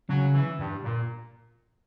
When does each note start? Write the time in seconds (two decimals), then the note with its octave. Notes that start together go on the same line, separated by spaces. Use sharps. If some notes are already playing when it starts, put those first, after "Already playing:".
0.09 C#3 F#3
0.34 E3
0.59 G2
0.84 A#2